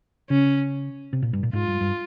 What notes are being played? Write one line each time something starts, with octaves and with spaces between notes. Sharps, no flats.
C#3 C#4
C3
A#2
G2
A#2
G#2 F4
G2
G2